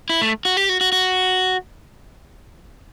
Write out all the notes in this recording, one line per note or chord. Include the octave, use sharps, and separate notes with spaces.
E4
A3
F#4
G4
F#4
F#4
F#4